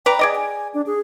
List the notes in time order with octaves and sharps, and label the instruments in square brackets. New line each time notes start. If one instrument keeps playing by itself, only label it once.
[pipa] B4 D5 A#5 [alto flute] G5
[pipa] G#4 D5 D#5
[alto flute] G#5
D4
G#4